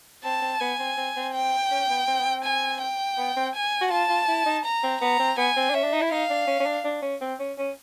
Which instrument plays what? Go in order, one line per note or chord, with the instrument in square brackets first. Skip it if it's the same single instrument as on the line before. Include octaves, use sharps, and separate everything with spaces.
[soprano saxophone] C4 [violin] A5
[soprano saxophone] C4
[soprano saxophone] B3 [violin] G#5
[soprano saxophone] C4
C4
C4
[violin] G5
[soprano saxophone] C#4
B3
C4
B3
C4
[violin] G#5
G5
[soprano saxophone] B3
C4
[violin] G#5
[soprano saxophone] F#4
[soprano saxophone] F4 [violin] A5
[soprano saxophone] F4
E4
D#4
[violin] A#5
[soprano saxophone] C4
[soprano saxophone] B3 [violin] A#5
[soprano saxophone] C4
[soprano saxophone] B3 [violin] G#5
[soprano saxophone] C4
D4
[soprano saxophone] C#4 [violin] E5
[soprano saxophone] D4
D#4
E4
[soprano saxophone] D#4 [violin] F5
[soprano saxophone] D4
C#4
C#4
D4
D4
C#4
C4
C#4
C#4